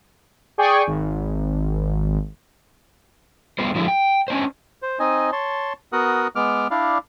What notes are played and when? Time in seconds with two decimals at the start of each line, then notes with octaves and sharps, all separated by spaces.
0.58 G#4 D5 G5 G#5 C#6
0.87 G#1
3.59 G3 B3 F4 C5
3.76 D3 F3 F#3 G#3 E4
3.88 G5
4.28 C#4 D4 C5
4.82 C5
4.99 C4 D#4 D#5 G#5
5.32 C#5 A5 C6
5.93 B3 F#4 A#4 F#5 D#6
6.36 G#3 B3 D6 F6
6.71 D4 E4 D5 F5